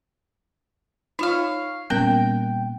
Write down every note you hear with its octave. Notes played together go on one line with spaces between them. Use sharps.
D#4 F4 C#5 F5
A#2 G3 B3 C#4 A#4 G5